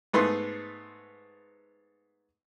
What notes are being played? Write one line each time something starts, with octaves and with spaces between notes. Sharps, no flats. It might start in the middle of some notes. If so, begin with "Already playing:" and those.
G#2 A3 B3 B4 C6